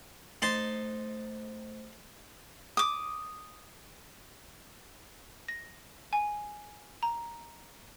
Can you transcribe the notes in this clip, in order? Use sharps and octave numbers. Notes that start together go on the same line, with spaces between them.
A3 D#4 C5 A5 C6
D6 D#6
A#6
G#5
A#5